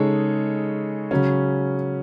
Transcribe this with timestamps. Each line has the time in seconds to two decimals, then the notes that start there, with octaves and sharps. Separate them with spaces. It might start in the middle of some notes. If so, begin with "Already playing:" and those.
Already playing: C#3 G#3 D#4 A4 C#5
1.11 C#3 F#3 C#4